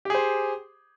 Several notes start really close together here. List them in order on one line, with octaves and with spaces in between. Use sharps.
G4 G#4 C5